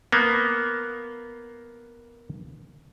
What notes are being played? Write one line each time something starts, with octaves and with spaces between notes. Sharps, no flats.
A#3 B3